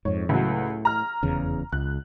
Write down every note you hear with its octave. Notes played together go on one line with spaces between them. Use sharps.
F2 G#2 C#5
C#2 A2 F#3
A#5 F6
F1 E2 C#3
C#2 F#6